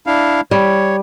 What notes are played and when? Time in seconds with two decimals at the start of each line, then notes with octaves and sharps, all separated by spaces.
0.07 D4 E4 F5
0.51 G3 C#5